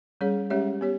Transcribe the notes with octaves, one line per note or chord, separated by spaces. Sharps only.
G3 C#4 G#4 C#5
G#3 C#4 G4 C#5 E5
B3 G4 C#5